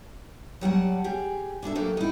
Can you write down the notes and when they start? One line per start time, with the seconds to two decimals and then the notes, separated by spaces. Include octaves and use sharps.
0.61 F#3 G3 F#5 A5
1.04 G4 G#4
1.62 D4 E4 A4 E5
1.75 F#3 A#3 G4 A4
1.97 D#4 E4